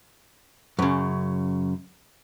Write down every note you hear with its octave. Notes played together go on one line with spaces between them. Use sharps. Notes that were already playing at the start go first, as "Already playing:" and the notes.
F#2 C#3